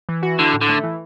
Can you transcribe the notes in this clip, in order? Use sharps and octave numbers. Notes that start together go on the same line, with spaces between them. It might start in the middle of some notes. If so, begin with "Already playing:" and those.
E3
F#4
D3 E4
A2
D3
A3
E3